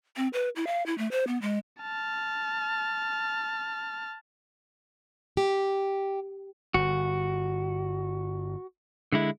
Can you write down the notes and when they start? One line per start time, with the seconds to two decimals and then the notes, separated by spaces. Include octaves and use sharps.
0.17 C4
0.33 B4
0.56 E4
0.67 F5
0.86 E4
0.98 A3
1.11 C5
1.27 B3
1.42 G#3
1.81 A5 F6
5.37 G4
6.74 G1 F#4
9.12 D3 G#3 E4